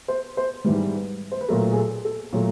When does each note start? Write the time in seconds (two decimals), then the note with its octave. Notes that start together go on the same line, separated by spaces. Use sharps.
0.08 C5
0.37 C5
0.65 G#2 E3 G3 B4
1.32 C5
1.41 B4
1.48 A#2 F#3 A3 A#4
1.72 G#4
1.76 A4
2.05 A4
2.33 A#2 F#3 A3